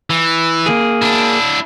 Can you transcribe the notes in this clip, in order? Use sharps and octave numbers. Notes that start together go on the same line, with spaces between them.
E3
A#3 G#4
D4 E4